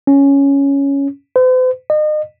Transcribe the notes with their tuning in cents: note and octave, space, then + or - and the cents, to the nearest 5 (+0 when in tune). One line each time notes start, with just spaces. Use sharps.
C#4 +5
C5 -45
D#5 -35